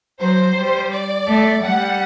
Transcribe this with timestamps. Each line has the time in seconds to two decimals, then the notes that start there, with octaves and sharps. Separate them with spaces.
0.21 F#3 C5
0.56 G3
0.92 D5
1.28 A3
1.64 G3 F#5